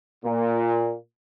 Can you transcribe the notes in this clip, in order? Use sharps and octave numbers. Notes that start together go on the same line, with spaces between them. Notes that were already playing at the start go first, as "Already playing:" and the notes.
A#2